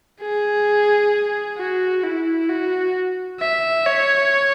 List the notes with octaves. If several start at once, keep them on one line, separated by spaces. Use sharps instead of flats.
G#4
F#4
E4
F#4
E5
C#5